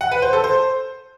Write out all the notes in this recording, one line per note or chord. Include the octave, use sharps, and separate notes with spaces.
F#5
B4
C5
A4
C5